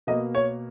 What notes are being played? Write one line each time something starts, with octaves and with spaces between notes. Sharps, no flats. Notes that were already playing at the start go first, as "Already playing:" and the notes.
B2 A#3 D#5
C#5